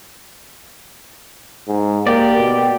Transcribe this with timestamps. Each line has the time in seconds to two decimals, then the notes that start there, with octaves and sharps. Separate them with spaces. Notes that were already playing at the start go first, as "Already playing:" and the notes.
1.68 G#2
2.07 A#3 G4 D5
2.37 B2